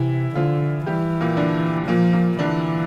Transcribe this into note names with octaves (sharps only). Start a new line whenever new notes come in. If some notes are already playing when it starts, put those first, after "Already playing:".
Already playing: C3 E3 E4
D3 F3 F4
E3 G3 G4
A#2 A#3
D3 D4
A#2 F3 A#3
A#2 A#3
D3 E3 D4